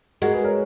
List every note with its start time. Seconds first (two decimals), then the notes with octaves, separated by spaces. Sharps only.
0.22 G#3 F#4 A#4
0.33 G#4 B4
0.44 A#4 C#5